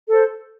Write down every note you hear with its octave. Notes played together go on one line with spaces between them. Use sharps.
A4 C5